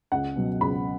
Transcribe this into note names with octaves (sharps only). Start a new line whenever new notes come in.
C#2 F#5
B2 F#3
C#2 B5